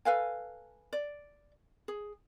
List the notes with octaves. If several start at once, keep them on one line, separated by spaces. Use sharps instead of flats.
A4 B4 F5 G#5
D5
G#4